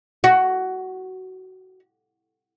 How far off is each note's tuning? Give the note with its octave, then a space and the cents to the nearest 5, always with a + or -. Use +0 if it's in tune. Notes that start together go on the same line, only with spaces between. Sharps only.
F#4 +15